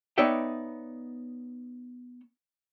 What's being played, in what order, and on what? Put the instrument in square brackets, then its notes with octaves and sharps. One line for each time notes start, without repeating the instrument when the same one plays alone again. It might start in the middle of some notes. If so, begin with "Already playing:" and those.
[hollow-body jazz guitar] B3 D#4 C#5 D5 E5 G5